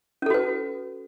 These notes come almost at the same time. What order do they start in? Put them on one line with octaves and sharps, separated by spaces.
C#4 A4 F#4 B4